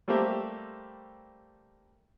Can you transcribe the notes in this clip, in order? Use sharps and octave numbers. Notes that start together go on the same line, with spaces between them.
G3 A3 A#3 C4 G4 E5